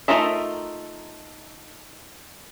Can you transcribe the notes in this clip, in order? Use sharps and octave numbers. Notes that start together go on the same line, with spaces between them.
A3 D#4 F4 A#4 E5